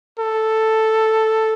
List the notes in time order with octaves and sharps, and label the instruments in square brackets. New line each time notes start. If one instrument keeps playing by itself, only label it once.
[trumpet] A4